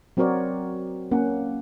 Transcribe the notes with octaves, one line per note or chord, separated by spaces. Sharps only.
F#3 C4 F#4 A#4 C#5 D5
A#3 C#4 F#5